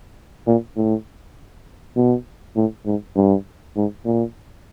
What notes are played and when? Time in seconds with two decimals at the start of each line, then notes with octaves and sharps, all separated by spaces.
0.47 A#2
0.76 A2
1.96 B2
2.56 A2
2.86 G#2
3.16 G2
3.76 G#2
4.05 A#2